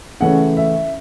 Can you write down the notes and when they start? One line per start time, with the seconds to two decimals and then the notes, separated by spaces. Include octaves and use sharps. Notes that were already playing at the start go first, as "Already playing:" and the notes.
0.20 C#3 E3 A3 C#4 F#5
0.57 E5